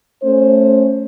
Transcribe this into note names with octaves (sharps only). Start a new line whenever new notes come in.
A3 C#4 C5